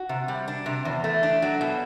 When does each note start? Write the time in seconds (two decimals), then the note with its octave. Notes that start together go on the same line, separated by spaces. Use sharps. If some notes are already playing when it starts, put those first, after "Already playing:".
Already playing: F#4
0.09 C3
0.28 G3
0.48 D4
0.66 C3
0.85 E2
1.04 A3
1.23 D4
1.42 F#3
1.61 B2